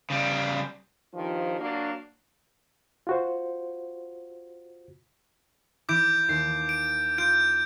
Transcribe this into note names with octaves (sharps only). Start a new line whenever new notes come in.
C#3 G3
G2 D#3 F3
F#3 A#3 D4 F#4
F4 F#4 C5
E3 E4 D6 G6 D7
D#2 C7
D7
F4 G6 D7